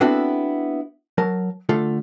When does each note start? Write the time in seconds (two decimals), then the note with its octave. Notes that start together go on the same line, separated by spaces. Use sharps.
0.01 B3 C4 D4 E4 F#4 A4
1.18 F#3 A#4 A5
1.69 D3 A3 F4 A4